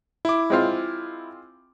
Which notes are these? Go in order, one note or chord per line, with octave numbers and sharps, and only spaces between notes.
E4 D6
G#3 C4 F4